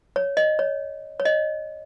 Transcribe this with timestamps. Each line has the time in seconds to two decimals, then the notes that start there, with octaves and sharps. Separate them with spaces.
0.16 C#5
0.37 D#5
0.59 C#5
1.20 C#5
1.25 D#5